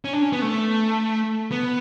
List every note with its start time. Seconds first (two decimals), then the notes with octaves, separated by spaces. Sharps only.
0.05 C#4
0.13 D4
0.22 C#4
0.33 B3
0.42 A3
1.51 B3